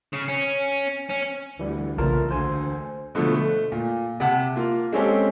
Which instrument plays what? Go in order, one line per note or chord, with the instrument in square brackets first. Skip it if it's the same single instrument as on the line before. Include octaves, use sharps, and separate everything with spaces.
[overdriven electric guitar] C#3
C#4
C#4
[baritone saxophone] D2 [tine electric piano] E3 G3
[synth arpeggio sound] B1 C#3 [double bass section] E3 A3 A#3 [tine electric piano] F4 A#4 A5
[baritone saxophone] D2 [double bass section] D3 [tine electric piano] C5 G#5
[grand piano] B2 D3 F3 A3
A3
A#2
C3 F#5 A5
A#3 F4
G#3 C4 C#4 G4 A4